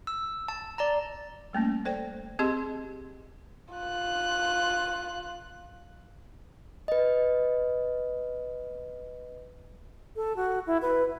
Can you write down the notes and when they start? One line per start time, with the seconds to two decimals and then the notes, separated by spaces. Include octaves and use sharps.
0.07 E6
0.48 A5
0.78 D5 A5 A#5
1.53 G3 A3 A#3 C#4
1.85 A4 C5 D5 G5
2.39 C4 G4 G#4 D#5 C6
3.74 F4 F#6
6.88 B4 D#5
10.16 A4
10.36 F#4
10.67 E4
10.82 B4